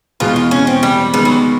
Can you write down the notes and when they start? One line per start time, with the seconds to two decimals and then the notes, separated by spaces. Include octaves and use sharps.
0.20 E2 B2 G#3 B3 F4
0.36 F4
0.51 C#4
0.67 C4
0.83 G3
1.14 D#3 G3 G#3 B3
1.25 F#3